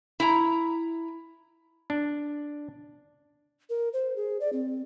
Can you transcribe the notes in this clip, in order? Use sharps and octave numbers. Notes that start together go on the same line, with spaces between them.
E4 A#5
D4
A#4
C5
G#4
D5
C4